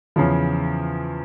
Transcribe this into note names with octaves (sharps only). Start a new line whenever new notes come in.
E2 C#3 F3